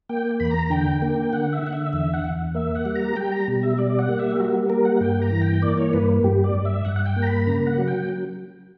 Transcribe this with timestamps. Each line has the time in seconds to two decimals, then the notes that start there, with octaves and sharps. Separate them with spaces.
0.09 A#3 G5
0.40 E2 B5
0.51 A#5
0.70 D3 G5
1.02 A#3
1.33 D3 F#5
1.53 E5
1.63 D3 F#5
1.73 E5
1.93 E2 E5
2.14 F#5
2.24 E2
2.55 A#3 E5
2.75 F#5
2.85 G3
2.96 A#5
3.16 G3 G5
3.32 A#5
3.48 B2
3.63 E5
3.77 G3 D5
3.99 F#5
4.09 A#3
4.19 E5
4.31 G4
4.40 G3 F#4
4.70 A#3 A#4
4.85 F#5
4.96 F#5
5.01 G2 G5
5.22 A#5
5.32 E3
5.41 G5
5.62 A#3 D5
5.77 C#5
5.93 G2 B4
6.24 G2 G4
6.44 D5
6.55 G2
6.65 E5
6.85 G2 F#5
6.96 F#5
7.06 G5
7.16 A#3
7.22 A#5
7.27 B5
7.47 C#3 A#5
7.67 F#5
7.78 F#3
7.88 G5